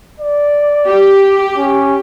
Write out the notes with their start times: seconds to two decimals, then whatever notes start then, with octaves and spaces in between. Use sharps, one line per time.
0.20 D5
0.87 G4
1.57 C#4